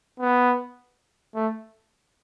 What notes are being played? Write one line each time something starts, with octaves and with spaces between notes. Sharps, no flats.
B3
A3